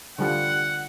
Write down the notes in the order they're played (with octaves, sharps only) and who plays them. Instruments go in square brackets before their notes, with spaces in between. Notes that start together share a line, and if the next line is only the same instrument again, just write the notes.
[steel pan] D3 G3 F4 [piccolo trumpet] F#5